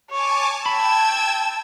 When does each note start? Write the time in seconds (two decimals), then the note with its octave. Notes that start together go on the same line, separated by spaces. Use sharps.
0.10 C#5 G#5 A5 D6
0.66 G5 A5 B5 E6 G#6